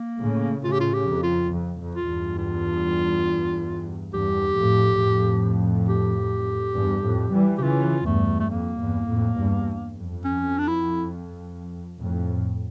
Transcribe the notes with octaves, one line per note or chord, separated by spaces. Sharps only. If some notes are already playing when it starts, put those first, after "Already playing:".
Already playing: A#3
A2 C#3
A2 C#3 F4
G4
F4
G4
F2
F4
F2
F2
F4
E2 G2
F4
E2 G2 G4
F2 A2
F2 A2
G4
E2 G2
F2 A2
E3 G3
G4
C#3 E3 F4
E2 G2 A3
A3
F2 A#3
E2 G2
F2 A2
E2 G2
F2
C#4
D4
E4
F2 A2